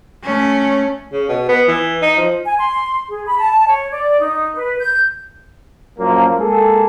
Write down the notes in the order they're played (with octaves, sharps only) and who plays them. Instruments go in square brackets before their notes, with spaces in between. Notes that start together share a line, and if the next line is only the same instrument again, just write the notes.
[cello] A3 C#4
[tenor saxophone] C#3
B2
B3
E3
D#4
F3
[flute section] G#5
C6
G#4
B5
A5
C#5
D5
D#4
B4
G6
[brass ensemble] F#2 A#2 F3 F#3 A#3
G#3 A#3 G#4 A4